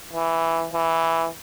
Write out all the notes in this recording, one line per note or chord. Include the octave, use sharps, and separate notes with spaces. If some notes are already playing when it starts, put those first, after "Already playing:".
E3
E3